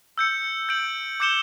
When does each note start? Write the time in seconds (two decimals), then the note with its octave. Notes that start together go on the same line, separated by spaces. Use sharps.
0.18 E6 G6 C#7
0.69 G6 D7 F#7
1.20 D6 G6 C#7 E7 G7